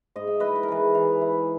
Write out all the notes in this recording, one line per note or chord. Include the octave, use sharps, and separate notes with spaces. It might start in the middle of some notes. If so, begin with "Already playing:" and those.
G#2 D#5
E5
E4 B4 D#5
B4
A#4
E3 G#4 B4
E3
E4